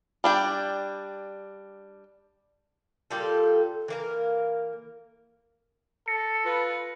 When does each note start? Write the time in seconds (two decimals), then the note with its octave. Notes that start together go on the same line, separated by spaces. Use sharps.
0.24 G3 D4 G5
3.10 A#2 G3 F4 A4
3.88 E3 A#3 A#4
6.08 A4 A#6 C#7
6.45 F4 B4